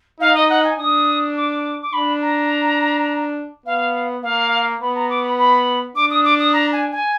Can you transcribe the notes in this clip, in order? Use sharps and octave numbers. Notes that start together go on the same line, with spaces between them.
D#4 F5
D#5
F#5
G#5
D4 D#6
D6
D6
D4 B5
A#5
B3 F5
A#3 F5
B3 B5
A#5
D6
B5
B5
D4 D6
D#6
D6
D#6
A#5
G#5
G#5